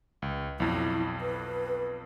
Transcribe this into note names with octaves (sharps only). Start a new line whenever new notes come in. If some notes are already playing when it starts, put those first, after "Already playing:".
C#2
B1 F2 E4
B4